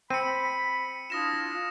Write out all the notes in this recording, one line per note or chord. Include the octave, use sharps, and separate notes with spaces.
C4 B5 C#7 D#7
D4 E4 F4 D#6 A#6 E7